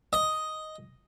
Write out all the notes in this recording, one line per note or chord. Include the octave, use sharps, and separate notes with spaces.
D#5